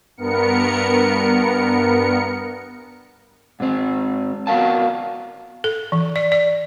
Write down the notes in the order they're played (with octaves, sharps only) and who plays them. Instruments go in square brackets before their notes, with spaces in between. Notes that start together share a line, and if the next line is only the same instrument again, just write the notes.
[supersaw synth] G2 B3 A#4 C#7
[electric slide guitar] G#2 C4
B3 F#4 A#4 F5 A5
[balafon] A4
E3
D5
D5